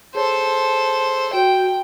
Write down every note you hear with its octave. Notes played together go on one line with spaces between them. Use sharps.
G#4 A4 C5 C#5
F#4 G5